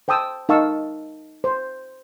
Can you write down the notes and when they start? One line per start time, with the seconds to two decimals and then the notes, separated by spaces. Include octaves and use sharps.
0.08 C5 G5 A5 D#6 E6
0.49 D#4 A#4 F5 A5 C#6 E6
1.44 C5